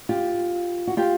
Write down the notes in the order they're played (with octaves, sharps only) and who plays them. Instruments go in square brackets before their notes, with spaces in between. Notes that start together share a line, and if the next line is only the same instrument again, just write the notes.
[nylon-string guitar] F4 G4
F#4
F4 G4